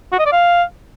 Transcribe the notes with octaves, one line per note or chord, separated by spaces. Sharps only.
F#4
D#5
D5
F5